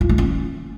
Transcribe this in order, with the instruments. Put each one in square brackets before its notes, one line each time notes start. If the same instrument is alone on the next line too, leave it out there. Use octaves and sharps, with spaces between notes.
[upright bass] F4
A3
C#4